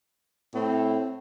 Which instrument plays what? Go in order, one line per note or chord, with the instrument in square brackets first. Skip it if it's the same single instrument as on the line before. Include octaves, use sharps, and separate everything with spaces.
[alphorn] A2 [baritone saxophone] C4